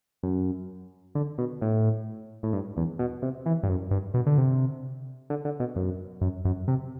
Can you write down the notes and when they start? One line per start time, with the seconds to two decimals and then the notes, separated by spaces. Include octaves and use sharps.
0.23 F#2
1.15 D3
1.38 B2
1.61 A2
2.43 A2
2.53 G2
2.77 E2
2.99 B2
3.22 C3
3.46 E3
3.63 G2
3.69 F#2
3.91 G2
4.14 B2
4.26 D3
4.38 C3
5.30 D3
5.45 D3
5.60 B2
5.76 F#2
6.21 F#2
6.45 F#2
6.68 C3